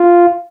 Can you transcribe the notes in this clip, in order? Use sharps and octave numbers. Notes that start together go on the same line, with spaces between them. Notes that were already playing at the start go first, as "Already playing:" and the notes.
Already playing: F4